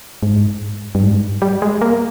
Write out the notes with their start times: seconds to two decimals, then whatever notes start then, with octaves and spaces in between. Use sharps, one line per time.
0.23 G#2
0.95 G2
1.02 G#2
1.42 G3
1.62 G#3
1.82 A#3